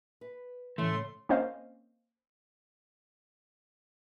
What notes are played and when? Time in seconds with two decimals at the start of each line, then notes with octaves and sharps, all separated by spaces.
0.21 B4
0.78 A2 C#3 E3 A3 C6
1.29 A#3 C4 C#4 C5 D#5 F5